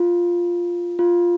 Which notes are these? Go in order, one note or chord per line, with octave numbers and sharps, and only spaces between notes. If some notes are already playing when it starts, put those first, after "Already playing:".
Already playing: F4
F4